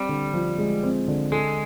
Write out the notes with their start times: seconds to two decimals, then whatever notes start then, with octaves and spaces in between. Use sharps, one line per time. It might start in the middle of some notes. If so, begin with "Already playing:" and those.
Already playing: G3 C4
0.09 D3
0.34 F3
0.58 G#3
0.83 C4
1.08 D3
1.32 G#3 A4